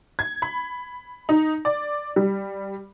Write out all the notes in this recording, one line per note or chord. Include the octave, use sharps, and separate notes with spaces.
G#6
B5
D#4
D5
G3